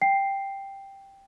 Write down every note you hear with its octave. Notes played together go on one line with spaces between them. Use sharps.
G5 C7